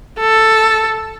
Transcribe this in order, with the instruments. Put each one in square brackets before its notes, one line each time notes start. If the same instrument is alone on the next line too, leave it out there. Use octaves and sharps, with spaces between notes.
[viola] A4